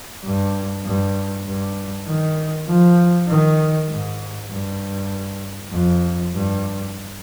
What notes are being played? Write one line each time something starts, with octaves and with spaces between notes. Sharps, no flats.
G2
G2
G2
D#3
F3
D#3
G#2
G2
F2
G2